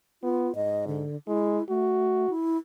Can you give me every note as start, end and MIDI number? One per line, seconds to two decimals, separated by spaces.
0.23 0.49 59
0.23 0.52 65
0.55 1.05 44
0.55 0.85 75
0.87 1.17 50
1.27 1.59 56
1.27 1.64 64
1.69 2.27 57
1.69 2.31 66
2.30 2.57 64